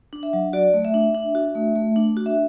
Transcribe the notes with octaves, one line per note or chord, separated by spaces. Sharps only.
D4
E5
F#3
F#4 D5
A3
E5
D4
D4
F#4
A3
A3
D4
F#4
E5